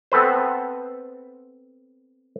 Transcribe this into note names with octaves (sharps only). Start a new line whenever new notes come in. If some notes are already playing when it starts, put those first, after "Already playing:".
B3 C4 A4 B4 C5